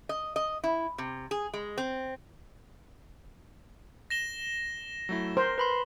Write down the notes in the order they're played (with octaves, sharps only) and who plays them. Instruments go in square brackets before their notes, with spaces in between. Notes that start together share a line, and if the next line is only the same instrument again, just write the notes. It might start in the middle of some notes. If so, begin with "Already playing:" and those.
[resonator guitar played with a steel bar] D#5
D#5
E4
C3
G#4
G#3
C4
[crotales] A#6 E7 G7
[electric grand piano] F#3 A3 E4
[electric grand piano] A#4 [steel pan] C5
[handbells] B4 B5 C6